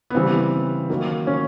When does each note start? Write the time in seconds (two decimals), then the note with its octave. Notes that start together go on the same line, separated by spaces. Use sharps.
0.10 B3
0.15 C#3 E3 G3 C4
0.89 D#3 F#3 A#3
1.27 C#4